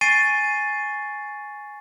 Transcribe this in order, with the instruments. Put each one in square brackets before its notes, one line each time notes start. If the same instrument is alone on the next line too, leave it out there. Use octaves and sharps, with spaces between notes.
[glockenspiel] G#5 C#6 A6 C7 D#7